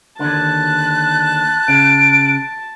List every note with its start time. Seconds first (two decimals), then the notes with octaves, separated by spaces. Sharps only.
0.20 D#2 D3 A5 F#6
1.68 C#3 D7